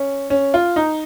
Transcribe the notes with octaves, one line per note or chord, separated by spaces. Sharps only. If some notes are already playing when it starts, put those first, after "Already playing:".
Already playing: C#4
C#4
F4
D#4